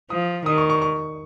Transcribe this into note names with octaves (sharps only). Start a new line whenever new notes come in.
F3 D#6
D#3 D#6
C#6
C#6
C#6